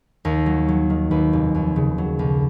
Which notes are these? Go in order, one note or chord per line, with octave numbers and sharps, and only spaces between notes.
D#2 A#4
F#3
F#3
D#3
D#2 B4
F1
D#2
C#3
F#3
B1